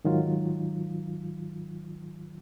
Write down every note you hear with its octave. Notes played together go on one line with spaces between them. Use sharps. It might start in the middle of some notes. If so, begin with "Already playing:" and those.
G#2 D#3 F#3 F4